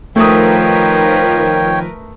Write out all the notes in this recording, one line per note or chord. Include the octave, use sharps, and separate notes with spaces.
D#3 F3 A3 A#4 B4 C#5 G5 D#6